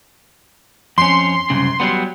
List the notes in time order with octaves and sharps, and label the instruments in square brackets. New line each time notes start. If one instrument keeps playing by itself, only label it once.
[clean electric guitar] F2 C#4 [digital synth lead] C6
[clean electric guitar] C2 F#2 C#3
F#3 G3 B3